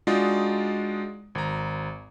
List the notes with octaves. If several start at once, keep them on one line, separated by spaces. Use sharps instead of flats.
G#3 D4 D#4 F4 F#4 D5
G#1 A#5